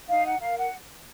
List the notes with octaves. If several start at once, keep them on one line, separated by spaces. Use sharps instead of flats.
D#4 F5
F#5
A#4 F5
F#5